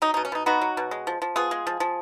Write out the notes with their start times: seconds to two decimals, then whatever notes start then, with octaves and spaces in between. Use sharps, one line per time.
0.02 F#3 D#4
0.14 D#4
0.17 B2
0.25 C#4
0.32 B2 D#4
0.46 B3 D#4 F#4
0.61 F#3
0.77 B2
0.91 G#3
1.07 F3
1.22 F3
1.36 B3 F4 G#4
1.51 G#3
1.67 F3
1.80 F3